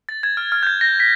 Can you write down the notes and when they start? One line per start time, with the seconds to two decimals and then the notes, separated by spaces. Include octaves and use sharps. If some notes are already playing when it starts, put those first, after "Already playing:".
0.09 A6
0.23 G#6
0.37 F6
0.52 F6
0.63 G6
0.67 G#6
0.81 A#6
1.00 B6